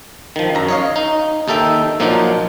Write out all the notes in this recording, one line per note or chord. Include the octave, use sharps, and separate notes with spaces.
D#3 F3
F#2 A#5
C#5 D#5 F5
D#4
D#2 D#4 A4 E5 G5
A#2 F3 F#3 D4 D#4 F4